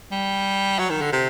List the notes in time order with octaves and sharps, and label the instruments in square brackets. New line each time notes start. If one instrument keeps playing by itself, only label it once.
[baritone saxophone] G3
F#3
D#3
D3
C3